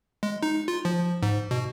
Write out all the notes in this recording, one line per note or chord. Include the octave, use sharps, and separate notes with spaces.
G#3
D#4
F4
F3
G#2
B2